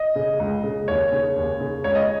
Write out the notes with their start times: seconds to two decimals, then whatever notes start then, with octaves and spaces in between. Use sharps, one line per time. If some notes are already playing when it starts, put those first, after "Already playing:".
Already playing: D#5
0.15 C#3
0.39 C#2
0.63 C#3
0.88 D#2 C#5
1.12 C#3
1.36 D#2
1.60 C#3
1.84 C#2 C#5
1.95 D#5